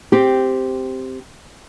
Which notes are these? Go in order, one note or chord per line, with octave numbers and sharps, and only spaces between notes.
C4 G4